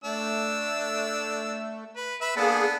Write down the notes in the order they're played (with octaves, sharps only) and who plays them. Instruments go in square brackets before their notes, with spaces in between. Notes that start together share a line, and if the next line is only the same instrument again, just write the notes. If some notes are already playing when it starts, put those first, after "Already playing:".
[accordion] A3 [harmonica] D4 E6
[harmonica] B4
B4 E5
[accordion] A#3 G#4 [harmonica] B3 D4 A4